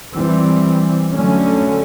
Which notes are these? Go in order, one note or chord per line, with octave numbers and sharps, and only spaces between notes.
E3 G3 C4
D3 F#3 A3 C#4